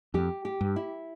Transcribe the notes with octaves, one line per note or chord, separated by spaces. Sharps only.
F2 G4
G4
G2
E4